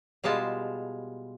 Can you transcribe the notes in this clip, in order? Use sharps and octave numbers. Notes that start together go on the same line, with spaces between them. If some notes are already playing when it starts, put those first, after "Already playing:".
B2 G3 G#3 F4 A5